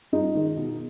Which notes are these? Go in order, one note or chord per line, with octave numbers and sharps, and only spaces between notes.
G2 D#4 F4
D#3 G#3
B2